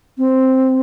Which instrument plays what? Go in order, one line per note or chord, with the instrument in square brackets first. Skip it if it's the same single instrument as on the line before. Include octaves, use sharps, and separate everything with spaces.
[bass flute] C4